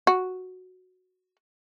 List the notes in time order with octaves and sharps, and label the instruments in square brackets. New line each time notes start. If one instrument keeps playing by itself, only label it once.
[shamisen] F#4